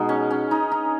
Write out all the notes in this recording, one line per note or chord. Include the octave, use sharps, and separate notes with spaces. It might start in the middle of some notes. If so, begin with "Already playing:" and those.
Already playing: B2 G#3 D#4
C#4
C#4
D#4
D#4